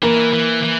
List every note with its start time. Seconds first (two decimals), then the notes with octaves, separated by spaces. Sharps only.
0.03 E3 A#3 A#4
0.33 E3
0.63 E3